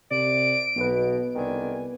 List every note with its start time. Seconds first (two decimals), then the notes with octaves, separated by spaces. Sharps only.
0.11 C2 C3 D5 D7
0.76 B1 B2 B3 B4
1.35 C2 D3 D#3 G#5